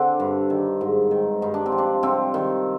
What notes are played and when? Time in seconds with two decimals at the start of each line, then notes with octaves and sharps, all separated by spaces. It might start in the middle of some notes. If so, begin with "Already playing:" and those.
Already playing: D3 C4 D4
0.20 G2
0.50 D#3
0.81 G#2
1.11 D#3
1.42 G2 D#4
1.54 D4
1.66 C4
1.72 F3
1.78 D4
2.03 C3 C4
2.34 D#3